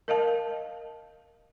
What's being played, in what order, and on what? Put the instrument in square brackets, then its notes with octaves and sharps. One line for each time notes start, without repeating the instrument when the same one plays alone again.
[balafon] A#4 D#5 F5 A5